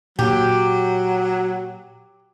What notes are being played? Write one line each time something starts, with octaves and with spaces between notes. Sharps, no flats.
A#2 F#3 G4